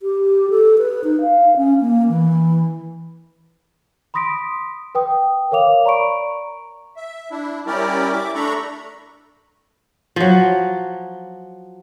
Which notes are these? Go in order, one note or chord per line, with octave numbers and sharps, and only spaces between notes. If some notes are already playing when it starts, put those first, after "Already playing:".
G4
A4
B4
D#4
F5
C#4
A#3
E3
B5 C6 D#6 A#6 B6 D7
B4 G5 D#6
A#4 C#5 F5 D6 F7
D5 A#5 B5 C#6 D7
E5
D4 E4
G3 C#4 E4 G4 A#4 D5
E5 D6
A3 D4 A4 A#5 B5 C#6
F3 F#3